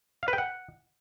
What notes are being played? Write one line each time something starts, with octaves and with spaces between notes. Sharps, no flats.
F5
B4
G5
F#5